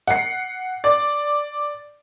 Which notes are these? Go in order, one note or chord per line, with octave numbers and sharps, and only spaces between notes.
F#5 C7
D5